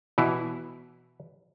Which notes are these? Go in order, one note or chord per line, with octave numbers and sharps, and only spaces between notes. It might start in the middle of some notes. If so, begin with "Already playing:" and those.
B2 E3 E4